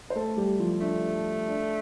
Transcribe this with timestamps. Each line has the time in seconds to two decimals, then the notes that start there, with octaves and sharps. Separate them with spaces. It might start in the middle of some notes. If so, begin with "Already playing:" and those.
0.10 C5
0.15 A3 A4
0.37 G3 G4
0.60 F3 F4
0.81 A3 D4
1.48 D4